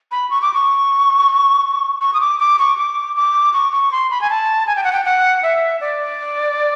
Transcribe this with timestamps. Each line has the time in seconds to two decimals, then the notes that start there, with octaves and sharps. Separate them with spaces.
0.11 B5
0.30 C#6
0.42 D6
0.54 C#6
2.01 C#6
2.14 D#6
2.21 D6
2.40 D6
2.59 C#6
2.78 D6
3.16 D6
3.53 C#6
3.72 C#6
3.92 C6
4.11 B5
4.21 G#5
4.30 A5
4.67 G#5
4.76 G5
4.84 F#5
4.93 G5
5.05 F#5
5.43 E5
5.81 D5